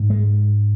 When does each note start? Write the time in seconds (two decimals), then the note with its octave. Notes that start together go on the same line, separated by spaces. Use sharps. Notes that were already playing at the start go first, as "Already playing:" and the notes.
Already playing: G#2
0.10 G#3